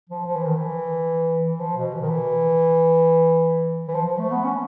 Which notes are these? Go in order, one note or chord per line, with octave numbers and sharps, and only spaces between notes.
F3
F3
E3
D#3
E3
E3
F3
B2
E3
D#3
E3
E3
F3
F3
A3
B3
C#4